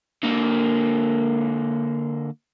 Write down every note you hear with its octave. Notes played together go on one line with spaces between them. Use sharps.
D3 A#3